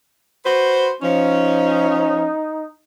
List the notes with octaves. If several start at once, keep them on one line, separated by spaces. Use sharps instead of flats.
F#4 B4 C5
F3 C#4 D#4